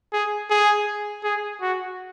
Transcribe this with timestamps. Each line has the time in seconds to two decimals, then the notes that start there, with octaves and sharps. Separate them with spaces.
0.13 G#4
0.51 G#4
1.24 G#4
1.61 F#4